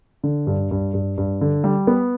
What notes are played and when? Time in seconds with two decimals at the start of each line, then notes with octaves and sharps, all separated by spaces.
0.24 D3
0.47 G2
0.71 G2
0.94 G2
1.18 G2
1.41 D3
1.64 G3
1.87 B3